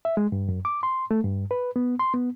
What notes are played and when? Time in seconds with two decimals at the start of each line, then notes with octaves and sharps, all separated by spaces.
0.05 E5
0.17 G#3
0.32 G2
0.49 F#2
0.65 D6
0.83 C6
1.11 A3
1.24 G2
1.51 B4
1.76 B3
1.99 C6
2.14 B3